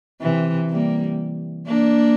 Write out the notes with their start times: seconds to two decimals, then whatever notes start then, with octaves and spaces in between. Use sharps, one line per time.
0.21 C3 E3
0.69 G3 A#3
1.67 A#3 D4